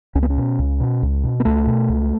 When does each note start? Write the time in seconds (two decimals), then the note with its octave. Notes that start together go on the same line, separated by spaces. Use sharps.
0.15 C#2 C#4
0.23 B3
0.30 C#4
0.37 B2
0.59 C#2
0.80 B2
1.03 C#2
1.24 B2
1.40 B3
1.45 C#2 A3
1.67 B2
1.89 C#2